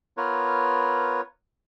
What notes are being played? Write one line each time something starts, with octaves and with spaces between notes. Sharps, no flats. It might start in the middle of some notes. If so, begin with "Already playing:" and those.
B3 F4 A#4 B4 C#5